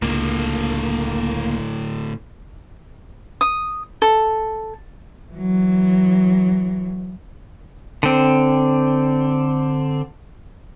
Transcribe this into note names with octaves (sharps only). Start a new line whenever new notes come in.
C#2 A2 D3 A#3
D#6
A4
E3 F#3
D3 C4